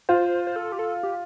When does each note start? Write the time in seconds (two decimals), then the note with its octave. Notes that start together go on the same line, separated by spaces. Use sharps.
0.09 F4 C5
0.47 C5
0.56 A4
0.72 G4
0.79 A4
1.03 G4